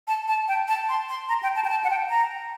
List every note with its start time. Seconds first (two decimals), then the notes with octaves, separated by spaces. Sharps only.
0.08 A5
0.28 A5
0.48 G5
0.68 A5
0.89 C6
1.09 C6
1.29 A#5
1.43 G5
1.55 A5
1.64 G5
1.69 A5
1.84 F#5
1.90 G5
2.10 A#5